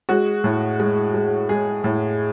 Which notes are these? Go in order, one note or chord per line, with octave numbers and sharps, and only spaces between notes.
G#3 F#4
A2
G#3
G#3
G#3 G#4
A2